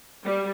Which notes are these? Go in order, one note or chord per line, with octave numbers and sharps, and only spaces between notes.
G3